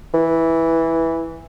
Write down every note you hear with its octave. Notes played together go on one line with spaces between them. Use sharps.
E3